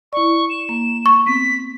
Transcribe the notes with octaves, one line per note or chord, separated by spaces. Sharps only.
E4 D5 C#6
E7
A#3
C#6
B3 C4 B6